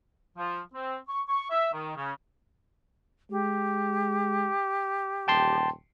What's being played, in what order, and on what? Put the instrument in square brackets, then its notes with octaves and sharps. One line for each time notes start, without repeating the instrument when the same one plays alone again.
[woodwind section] F3
C4
C#6
C#6
E5
D#3
C#3
[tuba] G#3 [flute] G4
[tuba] D#1 [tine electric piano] G5 A5 C6